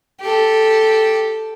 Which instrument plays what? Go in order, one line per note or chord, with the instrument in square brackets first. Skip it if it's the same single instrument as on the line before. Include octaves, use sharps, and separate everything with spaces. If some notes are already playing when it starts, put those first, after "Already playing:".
[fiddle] G4 A4